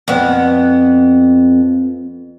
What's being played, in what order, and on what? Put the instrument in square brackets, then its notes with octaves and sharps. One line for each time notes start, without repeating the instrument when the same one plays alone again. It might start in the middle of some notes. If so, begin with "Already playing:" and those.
[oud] F2 B3